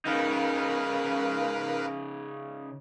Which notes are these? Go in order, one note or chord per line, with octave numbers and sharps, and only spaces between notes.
C#3 D#4 A#4 B4 F5